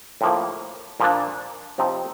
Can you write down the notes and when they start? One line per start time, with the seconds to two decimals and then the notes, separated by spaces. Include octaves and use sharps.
0.21 A2 F3 A#3
1.00 A#2 F3 A#3 D4
1.78 C3 F3 C4 D#4